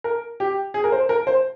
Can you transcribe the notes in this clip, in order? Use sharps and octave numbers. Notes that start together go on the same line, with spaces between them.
A#4
G4
G#4
A#4
C5
A#4
C5